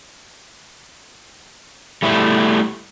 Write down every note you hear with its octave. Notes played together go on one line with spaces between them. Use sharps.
G3 A3 E4